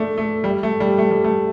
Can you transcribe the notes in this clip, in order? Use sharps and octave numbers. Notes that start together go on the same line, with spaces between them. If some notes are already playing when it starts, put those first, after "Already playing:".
Already playing: A3 D4
A3
G3
A3
G3
A3
G3
A3